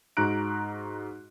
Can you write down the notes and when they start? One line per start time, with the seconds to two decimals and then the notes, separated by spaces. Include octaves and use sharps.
0.17 G#2 D#4 F#4 A#5 F#6 D7